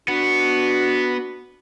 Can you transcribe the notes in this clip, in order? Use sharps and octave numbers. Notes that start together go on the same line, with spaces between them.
B3 D4 F#4